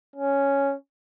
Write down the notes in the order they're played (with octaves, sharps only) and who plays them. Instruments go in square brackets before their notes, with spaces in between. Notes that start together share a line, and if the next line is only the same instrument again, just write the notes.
[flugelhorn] C#4